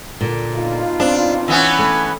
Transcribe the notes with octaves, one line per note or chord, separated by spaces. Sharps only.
A#2 D3
B2 D#4 F4
C4 D4
E3 B3 C#4
A3